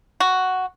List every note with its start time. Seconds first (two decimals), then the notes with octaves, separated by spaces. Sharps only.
0.20 F#4